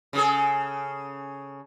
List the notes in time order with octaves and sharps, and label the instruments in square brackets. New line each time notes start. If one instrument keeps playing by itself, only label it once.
[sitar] C#3 G#4 A4